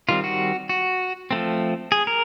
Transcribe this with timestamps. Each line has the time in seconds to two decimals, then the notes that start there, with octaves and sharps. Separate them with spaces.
0.09 D#3 G3 C4 F4
0.24 F#4
0.69 F#4
1.31 F3 A3 C4
1.92 G#4
2.07 A#4